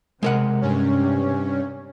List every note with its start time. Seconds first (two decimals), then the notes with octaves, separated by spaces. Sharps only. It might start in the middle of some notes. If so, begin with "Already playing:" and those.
0.23 C3 G#3 A#4 F#5
0.61 G2 C#4